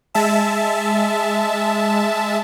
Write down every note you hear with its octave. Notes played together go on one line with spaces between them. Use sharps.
G#3 E5 A5